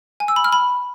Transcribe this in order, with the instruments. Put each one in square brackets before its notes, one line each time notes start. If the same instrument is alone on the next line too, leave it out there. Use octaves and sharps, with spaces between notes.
[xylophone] G#5
E6
B5
F6
B5